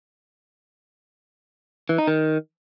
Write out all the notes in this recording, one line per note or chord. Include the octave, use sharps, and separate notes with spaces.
E3
D#4
D#3